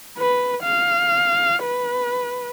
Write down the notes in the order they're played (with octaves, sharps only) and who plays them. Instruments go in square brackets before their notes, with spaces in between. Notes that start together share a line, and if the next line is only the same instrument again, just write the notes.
[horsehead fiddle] B4
F5
B4